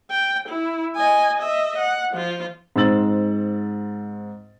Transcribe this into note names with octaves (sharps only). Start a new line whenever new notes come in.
G5
E4
D#5 G#5
D#5 E5
F#5
F3 F4
G#2 C4 C6 E6 A6 F#7